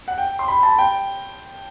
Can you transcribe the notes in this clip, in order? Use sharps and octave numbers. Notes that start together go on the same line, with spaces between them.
F#5
G5
C6
B5
A5
G5